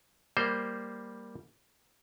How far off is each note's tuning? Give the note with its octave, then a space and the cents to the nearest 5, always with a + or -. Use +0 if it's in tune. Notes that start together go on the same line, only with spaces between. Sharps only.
G3 +0 A#3 +0 C5 +0